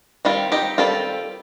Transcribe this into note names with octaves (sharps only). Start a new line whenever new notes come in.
D#3 G3 C4 F4
D#4 G4
D#3 G3 C4 F4 A4